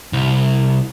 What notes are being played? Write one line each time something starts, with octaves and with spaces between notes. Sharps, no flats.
C2